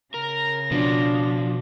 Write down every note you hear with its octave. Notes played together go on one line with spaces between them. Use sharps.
C#3 A#4 A#6
B2 F3 D4